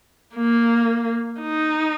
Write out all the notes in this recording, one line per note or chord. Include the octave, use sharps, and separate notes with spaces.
A#3
D#4